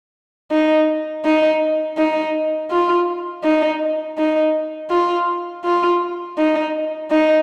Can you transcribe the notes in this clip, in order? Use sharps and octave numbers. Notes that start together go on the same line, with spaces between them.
D#4
D#4
D#4
F4
D#4
D#4
F4
F4
D#4
D#4